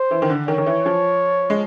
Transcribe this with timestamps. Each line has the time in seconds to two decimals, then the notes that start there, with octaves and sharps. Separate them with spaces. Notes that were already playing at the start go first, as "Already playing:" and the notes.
Already playing: C5
0.11 E3
0.22 D#3
0.30 D3
0.48 D#3 C#5
0.58 D#3
0.66 E3
0.86 F3
1.50 G#3